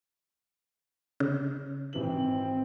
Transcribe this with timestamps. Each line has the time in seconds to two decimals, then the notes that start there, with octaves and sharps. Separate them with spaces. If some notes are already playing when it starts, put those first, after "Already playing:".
1.20 C#3
1.93 G#1 E3 C4 F#7